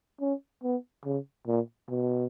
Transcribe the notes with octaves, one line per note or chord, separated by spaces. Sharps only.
C#4
B3
C#3
A#2
B2